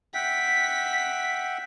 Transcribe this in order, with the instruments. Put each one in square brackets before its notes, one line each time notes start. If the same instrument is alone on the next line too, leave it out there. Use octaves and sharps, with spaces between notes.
[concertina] E5 F#5 G5 [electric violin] B6